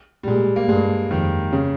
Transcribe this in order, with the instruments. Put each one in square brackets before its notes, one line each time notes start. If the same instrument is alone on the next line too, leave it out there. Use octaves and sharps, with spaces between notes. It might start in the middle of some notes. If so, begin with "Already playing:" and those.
[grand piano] G3
[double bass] A#2 [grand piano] G#3
[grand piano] A#3
[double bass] G2 [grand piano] G#3
[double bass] F2 [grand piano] D#3
[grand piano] C#3